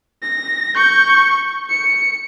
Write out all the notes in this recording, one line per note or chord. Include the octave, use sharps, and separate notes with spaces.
A#6
C#6 G6
C#7